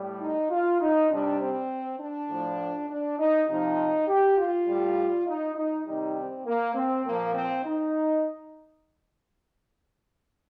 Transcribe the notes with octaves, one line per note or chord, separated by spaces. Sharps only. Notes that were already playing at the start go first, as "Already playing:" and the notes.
Already playing: A2 G3
D#4
F4
D#4
C3 G3 D4
C4
D4
A2 F3
D4
D#4
C3 F3 D#4
G4
F4
A2 G3
D#4
D#4
C3 D#3 G3 D#4
C4
A#3
C4
A#2 F3 A#3
C4
D#4